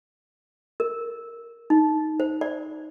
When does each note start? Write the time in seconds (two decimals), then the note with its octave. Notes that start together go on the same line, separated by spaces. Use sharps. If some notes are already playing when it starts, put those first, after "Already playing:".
0.80 A#4
1.70 D#4
2.20 C5
2.41 D5